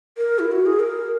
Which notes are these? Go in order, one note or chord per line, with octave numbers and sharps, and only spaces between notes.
A#4
E4
F#4
G#4
A#4